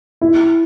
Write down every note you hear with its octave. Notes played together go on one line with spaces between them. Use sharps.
E4